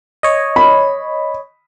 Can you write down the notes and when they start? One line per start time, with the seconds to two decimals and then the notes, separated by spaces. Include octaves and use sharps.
0.23 C#5 D#5
0.56 B5